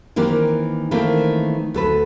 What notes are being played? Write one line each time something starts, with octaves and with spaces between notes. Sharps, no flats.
D#3 E3 A#3 C4 G4
D#3 E3 A3 A#3 C4
D2 A4 B4